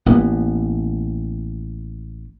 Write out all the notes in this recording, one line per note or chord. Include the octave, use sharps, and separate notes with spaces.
A1 A#3 B3